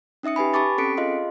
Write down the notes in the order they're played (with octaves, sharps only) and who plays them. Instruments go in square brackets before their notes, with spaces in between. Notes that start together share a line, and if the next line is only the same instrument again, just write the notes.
[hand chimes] C#4 D#4 E5 D#6 C#7
G4 B4 G#5 B5
G4 A5 B5 C#6 D6 A6
C4 C#4 A4 B6 C#7 D7
F4 G#4 D#5 F5 C6